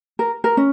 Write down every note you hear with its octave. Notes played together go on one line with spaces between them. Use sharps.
A#4
A#4
C#4